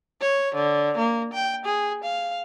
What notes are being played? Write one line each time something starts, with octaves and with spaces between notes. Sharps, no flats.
C#5
D3
A#3
G5
G#4
F5